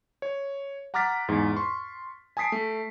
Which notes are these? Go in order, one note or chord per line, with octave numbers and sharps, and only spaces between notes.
C#5
F#5 A#5 D6 F6 A6 B6
E2 G#2
C6 C#6
G#5 A5 D#6 B6 C7 D7
A3